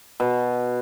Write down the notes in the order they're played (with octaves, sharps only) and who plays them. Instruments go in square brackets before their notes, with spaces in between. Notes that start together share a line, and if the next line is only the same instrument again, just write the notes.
[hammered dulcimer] B2